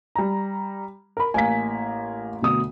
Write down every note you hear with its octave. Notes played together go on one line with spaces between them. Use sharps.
G3 A#5
A#4 B5
A1 A#3 G#5 B6
D2 B2 D#6